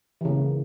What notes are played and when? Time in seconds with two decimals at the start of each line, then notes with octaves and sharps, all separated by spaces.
0.21 E3
0.25 C#3
0.29 A#3